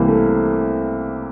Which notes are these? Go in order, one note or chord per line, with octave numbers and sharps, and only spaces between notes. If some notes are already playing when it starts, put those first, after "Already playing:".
Already playing: C2 C3 E3 A#3
A3